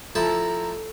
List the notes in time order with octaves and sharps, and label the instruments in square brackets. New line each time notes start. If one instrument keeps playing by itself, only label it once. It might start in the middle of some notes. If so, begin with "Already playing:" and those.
[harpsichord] F3 E4 A5 [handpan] A4 [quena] A#5